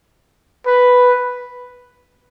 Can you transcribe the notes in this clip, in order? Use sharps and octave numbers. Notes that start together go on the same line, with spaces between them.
B4